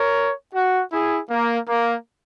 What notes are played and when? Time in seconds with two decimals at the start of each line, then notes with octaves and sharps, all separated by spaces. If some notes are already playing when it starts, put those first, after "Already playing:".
Already playing: A#4 C#5
0.55 F#4
0.92 E4 G#4
1.31 A#3
1.68 A#3